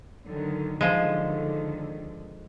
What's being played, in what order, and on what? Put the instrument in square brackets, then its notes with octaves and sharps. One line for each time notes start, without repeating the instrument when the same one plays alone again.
[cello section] D3 D#3 F#3
[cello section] D3 D#3 [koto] F3 G#3